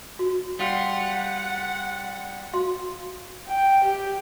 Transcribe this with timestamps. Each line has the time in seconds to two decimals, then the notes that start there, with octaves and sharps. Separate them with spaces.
0.19 F#4
0.59 G3 F4 F#5
2.54 F#4 F5 C6
3.48 G5
3.85 G4